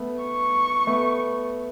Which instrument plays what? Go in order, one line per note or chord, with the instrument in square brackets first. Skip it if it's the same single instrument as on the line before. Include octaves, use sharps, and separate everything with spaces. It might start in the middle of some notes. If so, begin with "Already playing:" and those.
Already playing: [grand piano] A3 B3
[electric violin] C#6
[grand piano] A3 B3